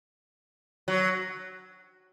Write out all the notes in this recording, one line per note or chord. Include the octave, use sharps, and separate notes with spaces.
F#3